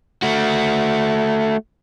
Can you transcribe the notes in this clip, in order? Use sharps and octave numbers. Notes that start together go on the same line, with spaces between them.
A3 F#4